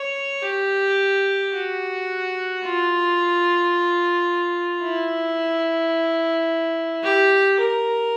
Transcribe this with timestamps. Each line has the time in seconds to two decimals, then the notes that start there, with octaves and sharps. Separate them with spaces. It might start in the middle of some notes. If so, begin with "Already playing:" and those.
Already playing: C#5
0.43 G4
1.53 F#4
2.63 F4
4.83 E4
7.04 G4
7.60 A#4